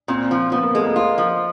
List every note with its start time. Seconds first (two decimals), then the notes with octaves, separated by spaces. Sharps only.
0.08 A#2 C4
0.31 F3
0.52 F3 B3
0.63 A#3
0.75 G#3 A3
0.85 A#3
0.96 F4
1.18 F3